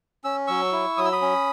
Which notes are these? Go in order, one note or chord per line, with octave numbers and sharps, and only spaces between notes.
C#4 E6
F#3 C#6 E6
E4
F#3 D#6
E6
B5 D#6
C#4